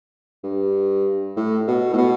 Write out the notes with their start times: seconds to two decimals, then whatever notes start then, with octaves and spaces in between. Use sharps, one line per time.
0.44 G2
1.36 A2
1.68 B2
1.93 A2
1.98 B2